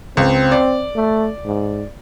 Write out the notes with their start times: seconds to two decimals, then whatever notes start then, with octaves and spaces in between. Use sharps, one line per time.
0.17 C#2 C4
0.52 D5
0.95 A3
1.45 G#2